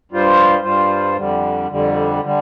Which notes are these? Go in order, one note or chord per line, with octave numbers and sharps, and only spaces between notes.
G2 G3 F4 C5
G2 G3 F4 C5
F2 D3 G3
F2 D3 G3
D3 G3